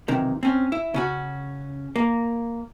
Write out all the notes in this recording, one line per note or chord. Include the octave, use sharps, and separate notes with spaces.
B1 C3 D#3 E3
C4 C#4
E4
C#3 C#4 F#4
A#3